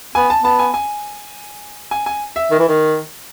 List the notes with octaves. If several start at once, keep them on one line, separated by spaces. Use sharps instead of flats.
B3 G#5
A5
B3 A5
G#5
G#5
G#5
G#5
E5
D#3
E3
D#3